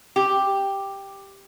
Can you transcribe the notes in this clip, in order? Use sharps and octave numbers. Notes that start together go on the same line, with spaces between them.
G4